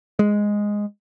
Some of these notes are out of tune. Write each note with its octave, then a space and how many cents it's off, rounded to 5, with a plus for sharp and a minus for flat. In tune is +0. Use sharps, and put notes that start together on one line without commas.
G#3 -5